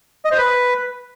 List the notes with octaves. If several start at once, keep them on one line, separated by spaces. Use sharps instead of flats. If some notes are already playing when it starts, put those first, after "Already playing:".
D#5
C5
B4